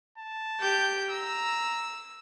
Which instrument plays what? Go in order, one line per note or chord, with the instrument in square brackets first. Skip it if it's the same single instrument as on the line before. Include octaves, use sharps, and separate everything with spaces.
[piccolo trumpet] A5
[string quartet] G4 G5 G6
[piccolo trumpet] A#5 [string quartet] E6